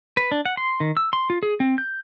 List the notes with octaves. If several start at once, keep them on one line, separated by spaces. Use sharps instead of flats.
B4
D4
F#5
C6
D#3
E6
C6
F4
G#4
C4
G6